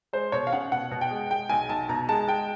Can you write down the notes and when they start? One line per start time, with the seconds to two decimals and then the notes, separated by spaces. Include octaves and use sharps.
0.13 G#3 C5
0.32 B2 C#5
0.47 F5
0.53 C#4 F#5
0.72 B2 F#5
0.91 B2
1.01 G5
1.11 G#3
1.30 G#3 G5
1.49 B1 G#5
1.69 B1 A5
1.89 B2 A#5
2.09 G#3 A5
2.28 G#3 G5